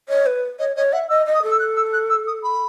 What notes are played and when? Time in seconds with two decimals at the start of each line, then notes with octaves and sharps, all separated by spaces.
0.09 C#5 D#5
0.26 B4
0.59 C#5 D#5
0.76 C#5 D#5
0.93 E5 F#5
1.09 D#5 E6
1.26 D#5
1.34 D#6
1.43 A4
1.51 E6
1.59 F#6
1.76 E6
1.93 F#6
2.10 E6
2.27 D#6
2.43 B5